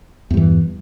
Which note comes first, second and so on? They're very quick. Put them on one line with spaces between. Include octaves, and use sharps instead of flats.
E2 G2 E3